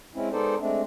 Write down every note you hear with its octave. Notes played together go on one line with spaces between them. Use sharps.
G#3 C4 C#4 E4
G#3 B3 D#4 A4 C5 D5
G#3 A3 C4 D4